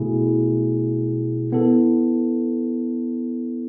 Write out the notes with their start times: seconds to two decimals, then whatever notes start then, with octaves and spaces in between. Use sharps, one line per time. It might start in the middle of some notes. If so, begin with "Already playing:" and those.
Already playing: B2 A3 E4 G#4
1.52 B3 E4 A4